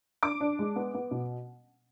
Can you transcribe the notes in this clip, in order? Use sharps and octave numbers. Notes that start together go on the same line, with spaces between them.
D4 D6
D4
G#3
B3
B3
B2